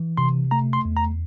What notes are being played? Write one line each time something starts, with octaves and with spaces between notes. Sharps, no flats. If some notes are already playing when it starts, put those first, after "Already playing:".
Already playing: E3
C3 C6
A3 A#5
C6
E2
A#5